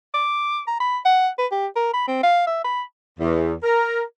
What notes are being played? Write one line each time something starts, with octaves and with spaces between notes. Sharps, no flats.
D6
A#5
B5
F#5
B4
G4
A#4
B5
C4
F5
E5
B5
E2
A#4